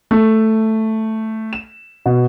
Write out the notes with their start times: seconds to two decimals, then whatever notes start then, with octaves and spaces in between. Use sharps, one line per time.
0.11 A3
1.53 E7
2.06 B2